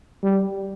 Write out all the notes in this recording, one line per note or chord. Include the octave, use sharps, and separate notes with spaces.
G3